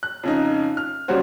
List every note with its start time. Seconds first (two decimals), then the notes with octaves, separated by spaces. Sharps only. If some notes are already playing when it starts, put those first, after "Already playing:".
0.03 F#6
0.23 F2 C#3 D#4
0.77 F6
1.08 C#3 F#3 G3 C#4 F#4 C5